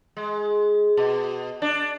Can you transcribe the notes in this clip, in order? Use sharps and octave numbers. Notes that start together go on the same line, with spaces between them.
G#3
B2
D4